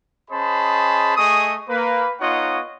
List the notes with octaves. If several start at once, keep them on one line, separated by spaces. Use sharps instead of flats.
C#4 G#4 C5 D#5 A5 B5
A3 G#4 D#5 C#6 D#6
A#3 B4
B3 D#4 F4 C#5 D#5 F#5